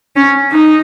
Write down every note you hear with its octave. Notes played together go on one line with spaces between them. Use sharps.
C#4
D#4